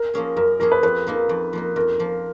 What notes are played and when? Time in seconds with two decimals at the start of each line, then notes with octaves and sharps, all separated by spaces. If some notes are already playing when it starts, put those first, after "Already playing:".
Already playing: A#4
0.14 F3 A#3 C#4 G#4
0.37 F#2 A#4
0.60 F3 A#3 C#4 G#4 A#4
0.72 B4
0.83 F2 B4
1.07 F3 A#3 D#4
1.29 F2
1.53 F3 A#3 D#4
1.76 F2 A#4
2.00 F3 A#3